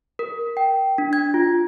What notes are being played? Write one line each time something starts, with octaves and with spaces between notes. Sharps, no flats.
A#4
G5
D4
G#6
F4